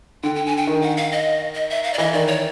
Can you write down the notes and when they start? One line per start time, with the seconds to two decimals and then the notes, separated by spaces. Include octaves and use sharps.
0.23 D3 G5
0.35 G5
0.46 G#5
0.57 G5
0.67 D#3
0.82 F#5
0.97 F5
1.12 D#5
1.55 D#5
1.70 E5
1.84 F5
1.93 D5
1.98 E3 D#5
2.13 D#3 D5
2.27 C#5